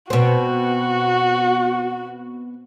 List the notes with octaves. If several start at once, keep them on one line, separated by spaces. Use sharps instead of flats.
B2 C4 F#4